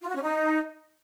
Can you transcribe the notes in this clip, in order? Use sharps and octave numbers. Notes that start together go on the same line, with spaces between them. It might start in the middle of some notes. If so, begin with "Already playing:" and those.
F4
F#4
C#4
D#4